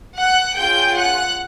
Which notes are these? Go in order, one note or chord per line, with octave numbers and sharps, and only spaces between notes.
F#5 F#6
C#4 F4 G#4 G5 G6
F#5 F#6